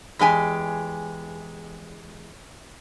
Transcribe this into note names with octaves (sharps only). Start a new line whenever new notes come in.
E2 G#3 G4 G#5